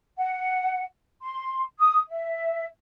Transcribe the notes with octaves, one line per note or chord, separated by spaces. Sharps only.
F#5
C6
D#6
E5